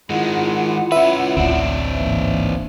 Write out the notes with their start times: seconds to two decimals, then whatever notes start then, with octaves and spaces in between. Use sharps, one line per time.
0.10 D#3 G#3 E4 F4 F#5
0.92 C#4 B4 E5
1.37 D1 A1 D2 C4 D4
1.96 G#2 E3 A#3